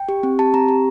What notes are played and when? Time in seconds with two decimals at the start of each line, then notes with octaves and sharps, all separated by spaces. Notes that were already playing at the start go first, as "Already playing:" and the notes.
Already playing: G5
0.09 G4
0.23 C4
0.39 G4 A5
0.54 C4 A#5
0.68 G4